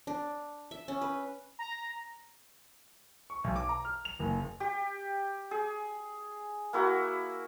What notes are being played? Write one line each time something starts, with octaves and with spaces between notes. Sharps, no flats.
D4
E5
C#4
B4
A#5
C#6
B1
D6
A#5
F6
F7
F#1
G4
G#4
A#3 E4 F#4